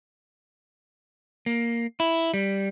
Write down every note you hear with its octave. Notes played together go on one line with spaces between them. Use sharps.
A#3
E4
G3